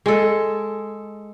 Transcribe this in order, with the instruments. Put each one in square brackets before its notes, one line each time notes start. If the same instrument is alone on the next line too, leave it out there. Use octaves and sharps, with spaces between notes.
[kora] G#3 A4